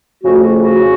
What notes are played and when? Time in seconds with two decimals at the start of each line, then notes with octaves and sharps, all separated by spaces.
0.23 F2 C#3 A3 F#4
0.42 F#4
0.61 F#4
0.81 C#3